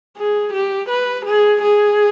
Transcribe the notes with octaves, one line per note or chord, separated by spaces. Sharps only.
G#4
G4
B4
G#4
G#4